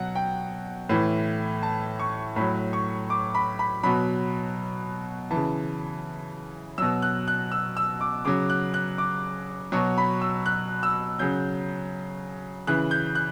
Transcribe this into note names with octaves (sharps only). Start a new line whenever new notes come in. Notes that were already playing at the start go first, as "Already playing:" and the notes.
Already playing: B2 F#3 F#5
G5
A2 E3
A5
C#6
A2 F#3 B5
C#6
D6
B5
B5
B2 F#3 B5
C#3 E3 A5
B2 F#3 E6
F#6
F#6
E6
E6
D6
C#3 F#3 D6
F#6
F#6
D6
B2 F#3 C#6
B5
E6
F#6
E6
C#3 F#3 G6
C#3 E3 F#6
G6
F#6